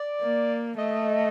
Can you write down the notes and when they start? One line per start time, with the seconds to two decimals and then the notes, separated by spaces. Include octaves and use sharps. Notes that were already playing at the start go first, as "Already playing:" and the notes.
Already playing: D5
0.21 A#3
0.78 A3 D#5